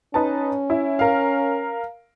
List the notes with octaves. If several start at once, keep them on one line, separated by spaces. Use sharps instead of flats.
C#4 D#4 B4 A5
E4
A#4 F5